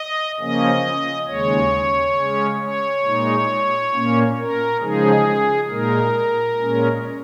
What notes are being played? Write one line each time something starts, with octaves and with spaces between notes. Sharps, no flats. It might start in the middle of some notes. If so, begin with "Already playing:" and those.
Already playing: D#5
C#3 F3 A#3 C#4 D#5
D#2 C#3 G#3 C#5
C#3 G#3 C#4
C#5
A#2 G#3 D#4
A#2 A#3 C#4
A#4
C#3 F3 G#3 D#4 G#4
A#2 G#3 D#4 A#4
A#2 G#3 C#4